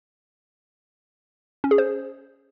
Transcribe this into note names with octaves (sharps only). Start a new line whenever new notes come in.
C#4
G#4
C5